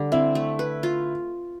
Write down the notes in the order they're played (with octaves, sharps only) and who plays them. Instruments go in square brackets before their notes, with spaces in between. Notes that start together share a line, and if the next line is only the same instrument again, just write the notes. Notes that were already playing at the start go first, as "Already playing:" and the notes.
Already playing: [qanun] D3 G3 D4
[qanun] C4 [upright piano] E4
[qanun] A3
B4
F4